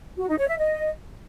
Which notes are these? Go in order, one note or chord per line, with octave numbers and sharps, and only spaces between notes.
F#4
D#4
C#5
E5
D#5